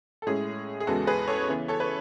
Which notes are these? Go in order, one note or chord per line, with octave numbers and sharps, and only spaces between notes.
A4
A2 G#3 C#4 G#4
G#4
E2 C#3 G#3 B3 F#4 A4
G#4 B4
A4 C#5
C#3 E3 B3
A4 C#5
B4